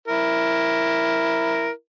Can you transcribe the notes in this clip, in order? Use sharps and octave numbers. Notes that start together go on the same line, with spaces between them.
E4 A#4